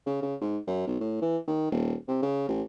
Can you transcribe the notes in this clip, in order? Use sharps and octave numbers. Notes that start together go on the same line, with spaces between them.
C#3
C#3
G#2
F#2
B1
A2
E3
D#3
D#1
C3
C#3
A1